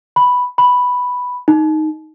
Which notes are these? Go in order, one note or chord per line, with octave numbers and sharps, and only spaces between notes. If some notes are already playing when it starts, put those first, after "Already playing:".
B5
B5
D#4